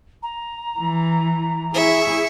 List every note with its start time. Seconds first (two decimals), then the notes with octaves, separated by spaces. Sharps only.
0.22 A#5
0.80 E3
1.74 E4 G#4 E5 C#6